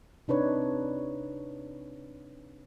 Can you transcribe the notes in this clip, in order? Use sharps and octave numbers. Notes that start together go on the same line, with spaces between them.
C3 D4 D#4 B4 C#5